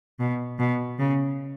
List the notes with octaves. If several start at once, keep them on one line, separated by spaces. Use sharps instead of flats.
B2
B2
C#3